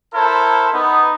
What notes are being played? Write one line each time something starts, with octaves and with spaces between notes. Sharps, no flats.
E4 A4 A#4 C5
B3 D#4